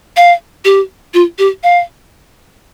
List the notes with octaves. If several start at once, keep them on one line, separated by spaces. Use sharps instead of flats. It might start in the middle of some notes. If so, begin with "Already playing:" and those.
F5
G4
F4
G4
F5